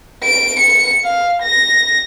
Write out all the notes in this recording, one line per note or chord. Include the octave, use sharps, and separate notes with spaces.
D7
C#7
F5
A#6